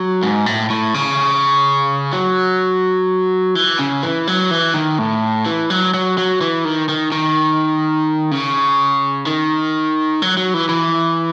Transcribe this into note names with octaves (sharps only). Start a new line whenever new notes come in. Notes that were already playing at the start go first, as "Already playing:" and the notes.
Already playing: F#3
G#2
A2
A2
C#3
F#3
E3
C#3
E3
F#3
E3
D#3
A2
E3
F#3
F#3
F#3
E3
D#3
D#3
D#3
C#3
D#3
F#3
F#3
E3
E3